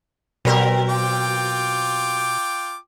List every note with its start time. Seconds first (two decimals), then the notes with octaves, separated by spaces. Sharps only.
0.45 B2 F#3 C4 A#4
0.89 F4 G5 D6